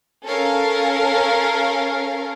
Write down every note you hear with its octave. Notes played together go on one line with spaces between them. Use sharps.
C#4 A4 A#4 C#5 F5